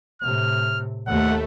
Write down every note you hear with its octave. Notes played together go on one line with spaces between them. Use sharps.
A2 C3 F6
D#2 A3 F#5